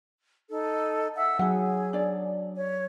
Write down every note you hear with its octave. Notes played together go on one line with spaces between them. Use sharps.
D#4 A4
E5 F#5 E6
F#3 D#4 G#4 F#5
D4 D5
C#5